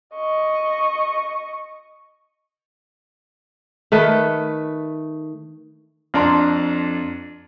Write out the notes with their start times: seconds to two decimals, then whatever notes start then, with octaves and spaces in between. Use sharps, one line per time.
0.15 D#5 C#6
3.92 D#3 A3 B4
6.14 F2 D4 A#5 C6